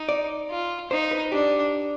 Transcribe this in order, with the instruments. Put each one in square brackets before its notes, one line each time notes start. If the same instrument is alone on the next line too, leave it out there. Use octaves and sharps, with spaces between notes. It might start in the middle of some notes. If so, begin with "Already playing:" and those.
Already playing: [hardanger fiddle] D#4
[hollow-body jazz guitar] D5
[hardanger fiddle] F4
[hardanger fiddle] D#4 [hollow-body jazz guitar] C5
[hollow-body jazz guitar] B4
[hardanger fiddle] D4 [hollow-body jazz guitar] G4